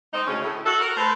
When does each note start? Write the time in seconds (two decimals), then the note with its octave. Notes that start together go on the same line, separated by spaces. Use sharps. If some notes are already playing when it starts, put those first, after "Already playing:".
0.12 G#3 C4 D#4
0.27 D2 C#3 C#4
0.41 A2
0.65 F#4 A4
0.81 A#4
0.96 A3 B4 C5